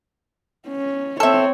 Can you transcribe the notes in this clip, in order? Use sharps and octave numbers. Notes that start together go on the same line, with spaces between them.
C#4
C4 A4 C#5 E5